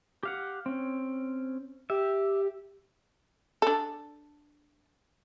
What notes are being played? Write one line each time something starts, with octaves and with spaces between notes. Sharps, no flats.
G4 F5 F#5
C4 C#4
G4 E5
D4 A4